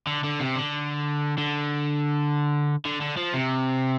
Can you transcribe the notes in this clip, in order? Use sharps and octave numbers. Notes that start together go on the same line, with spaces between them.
D3
D3
C3
D3
D3
D3
D3
F3
C3